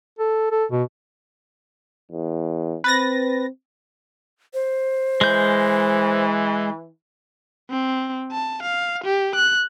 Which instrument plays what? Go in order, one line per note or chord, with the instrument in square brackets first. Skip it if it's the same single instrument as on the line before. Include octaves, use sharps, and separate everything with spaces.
[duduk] A4
A4
B2
[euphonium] E2
[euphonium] C4 [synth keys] B4 A6 A#6
[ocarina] C5
[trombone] E3 [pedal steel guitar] G#3 G6
[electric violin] C4
A5
F5
G4
F#6